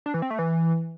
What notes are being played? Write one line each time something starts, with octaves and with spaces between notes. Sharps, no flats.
D4
E3
C4
A3
E3